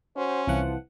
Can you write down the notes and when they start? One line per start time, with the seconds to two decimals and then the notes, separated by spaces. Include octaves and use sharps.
0.16 C#4 F#4 C5
0.47 C2 E3 F3 F#5